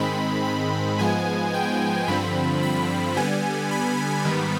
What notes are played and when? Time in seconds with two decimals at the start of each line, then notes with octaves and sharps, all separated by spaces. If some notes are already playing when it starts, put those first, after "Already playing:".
Already playing: G#2 D#3 G#3 C4 B5
0.45 B5
0.99 G#2 F3 G#3 B3 G#5
1.54 G5
2.08 G2 D3 F3 C4 B5
2.63 B5
3.16 D3 G3 B3 G#5
3.71 B5
4.25 G#2 D#3 G3 B3